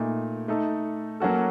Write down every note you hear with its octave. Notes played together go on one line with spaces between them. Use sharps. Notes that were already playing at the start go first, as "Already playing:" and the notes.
Already playing: A#2 A3 D#4
A3 D#4 A4
F#3 A#3 C#4 F#4 A4